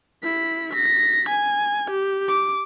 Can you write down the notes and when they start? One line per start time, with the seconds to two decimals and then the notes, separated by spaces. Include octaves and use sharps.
0.23 E4 B6
0.72 A#6 B6
1.29 G#5
1.91 G4
2.28 D6